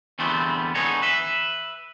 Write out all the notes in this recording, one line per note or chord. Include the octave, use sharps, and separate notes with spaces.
E2 D3 G3 A3 B3 C4
D3 B3 D#4 G#4 C#5
B4 E5